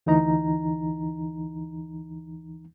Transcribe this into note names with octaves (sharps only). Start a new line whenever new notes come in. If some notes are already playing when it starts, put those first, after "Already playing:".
D2 E3 D#4 A#5